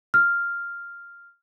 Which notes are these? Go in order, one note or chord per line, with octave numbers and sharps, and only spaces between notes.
F6